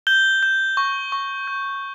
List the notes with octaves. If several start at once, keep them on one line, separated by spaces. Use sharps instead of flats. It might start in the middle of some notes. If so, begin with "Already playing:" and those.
G6 G7
G6
C#6
C#6
G6